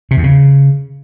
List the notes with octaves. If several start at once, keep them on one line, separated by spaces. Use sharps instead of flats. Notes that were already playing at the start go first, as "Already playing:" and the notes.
C3
E2
C#3